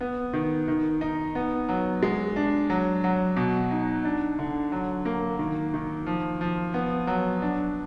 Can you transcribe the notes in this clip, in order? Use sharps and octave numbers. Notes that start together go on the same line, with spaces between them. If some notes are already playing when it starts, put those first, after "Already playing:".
B3
D#3
D#3
D#4
B3
F#3
G#3
D4
F#3
F#3
B2
D#4
D4
D3
F#3
A#3
D#3
D#3
F3
F3
B3
F#3
D4